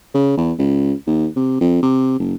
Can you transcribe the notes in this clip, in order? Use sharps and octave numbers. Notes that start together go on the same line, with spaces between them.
C#3
E2
C#2
D#2
C3
F2
C3
F#1